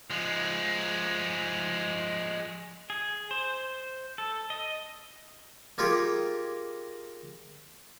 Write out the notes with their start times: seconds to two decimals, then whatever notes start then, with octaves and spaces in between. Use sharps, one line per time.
0.10 F3 G#3
2.90 G#4
3.31 C5
4.18 A4
4.50 D#5
5.78 A#3 D#4 F4 G4 G#4